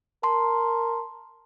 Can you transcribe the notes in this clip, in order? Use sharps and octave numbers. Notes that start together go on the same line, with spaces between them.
A#4 A5 C6